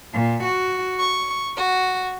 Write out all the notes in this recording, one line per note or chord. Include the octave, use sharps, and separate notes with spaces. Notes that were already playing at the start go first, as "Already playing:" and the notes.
A#2
F#4
C#6
F#4